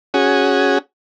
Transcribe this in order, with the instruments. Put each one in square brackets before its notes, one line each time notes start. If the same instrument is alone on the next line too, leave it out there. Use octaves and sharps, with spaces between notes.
[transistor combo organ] C#4 F#4 G#4